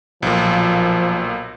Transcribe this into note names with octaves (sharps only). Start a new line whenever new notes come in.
B1 A#2 F3